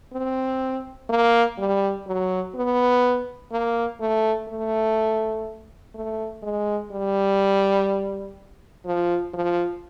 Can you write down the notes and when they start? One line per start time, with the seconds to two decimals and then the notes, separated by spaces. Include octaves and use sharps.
0.13 C4
1.10 A#3
1.58 G3
2.07 F#3
2.55 B3
3.52 A#3
4.01 A3
4.48 A3
5.95 A3
6.43 G#3
6.92 G3
8.85 F3
9.34 F3